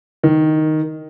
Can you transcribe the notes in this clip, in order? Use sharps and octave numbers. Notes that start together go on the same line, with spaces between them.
D#3